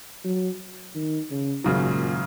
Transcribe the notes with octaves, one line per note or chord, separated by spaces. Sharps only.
F#3
D#3
C#3
G#1 F#2 A#2 C#3 F#3